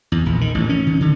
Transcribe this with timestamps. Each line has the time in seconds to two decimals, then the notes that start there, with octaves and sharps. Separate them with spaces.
0.12 E2
0.26 A#1
0.41 D#3
0.55 A1
0.69 C#4
0.87 D#3
1.01 D3